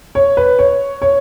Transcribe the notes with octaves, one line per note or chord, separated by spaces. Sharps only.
C#5
B4
C#5
C#5